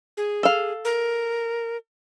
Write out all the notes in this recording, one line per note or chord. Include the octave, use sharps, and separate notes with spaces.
G#4
A4 F5
A#4